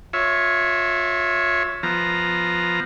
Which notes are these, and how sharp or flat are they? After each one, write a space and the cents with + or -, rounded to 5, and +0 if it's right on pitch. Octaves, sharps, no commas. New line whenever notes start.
F4 +30 C#5 +0 E5 +0
F3 +0 B3 +0 A#5 +0